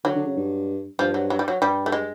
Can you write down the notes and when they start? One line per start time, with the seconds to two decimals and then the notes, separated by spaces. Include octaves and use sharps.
0.04 D3 F#3
0.15 D3
0.26 C#3
0.36 G2
0.99 G2 F3
1.14 F#3
1.30 F#3
1.39 G3
1.48 F#3
1.62 G2 G3
1.86 A3
1.92 G#3